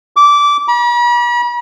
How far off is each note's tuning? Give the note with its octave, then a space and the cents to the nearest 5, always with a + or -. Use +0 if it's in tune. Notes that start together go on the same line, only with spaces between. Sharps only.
D6 -15
B5 -45